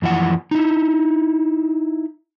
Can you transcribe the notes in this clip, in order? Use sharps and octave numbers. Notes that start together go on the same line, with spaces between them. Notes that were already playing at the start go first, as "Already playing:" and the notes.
F#2 E3 F3 F#5
D#4 E4